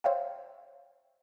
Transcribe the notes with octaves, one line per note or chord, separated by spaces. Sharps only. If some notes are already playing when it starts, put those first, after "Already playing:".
C5 C#5 E5 F5 G5